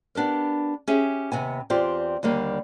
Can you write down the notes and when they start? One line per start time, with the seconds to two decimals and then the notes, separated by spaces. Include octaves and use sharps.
0.15 B3 D4 G4 A#4
0.88 C#4 G4 G#4 E5
1.32 D#2 C3 B3 G#5
1.70 E2 C4 F4 G4 D5
2.23 D#2 D3 G3 A#3